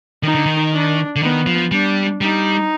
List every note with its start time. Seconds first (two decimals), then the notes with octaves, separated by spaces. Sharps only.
0.23 D#3 D#4
0.35 D3
0.46 D#3
0.72 D4
1.16 D3
1.22 D#3 B3
1.47 F3
1.72 G3 D4
2.21 G3 D#4